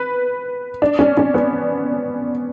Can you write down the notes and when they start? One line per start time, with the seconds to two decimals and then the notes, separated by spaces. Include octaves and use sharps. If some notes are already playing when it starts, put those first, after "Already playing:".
Already playing: B4
0.82 D4
0.99 C#4
1.17 C#4
1.34 B3